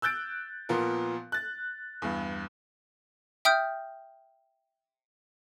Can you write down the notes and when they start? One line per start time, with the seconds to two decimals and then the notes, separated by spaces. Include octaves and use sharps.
0.02 E6 F#6 G6 A6 D7
0.69 A#2 F3 B3 F4 A#4
1.32 F#6 A6
2.02 E2 G2
3.45 E5 G5 D#6 F6 G6